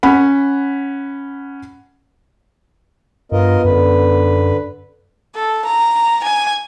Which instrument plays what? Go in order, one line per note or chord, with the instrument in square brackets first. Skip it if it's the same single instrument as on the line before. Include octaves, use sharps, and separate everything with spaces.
[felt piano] C#4 F#5 B5
[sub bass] G2 [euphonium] B3 [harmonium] F4 A#4 D#5
[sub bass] F#2 [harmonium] D3 B4
[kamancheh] A4
A#5
G#5